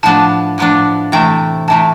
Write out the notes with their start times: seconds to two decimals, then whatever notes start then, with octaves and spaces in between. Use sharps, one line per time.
0.03 A2 F3 B3 D4 A5
0.58 A2 F3 B3 D4
1.12 C3 E3 A3 G5
1.68 C3 E3 A3 A5